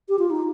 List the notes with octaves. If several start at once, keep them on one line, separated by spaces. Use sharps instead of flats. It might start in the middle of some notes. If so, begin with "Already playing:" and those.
G4
F4
D#4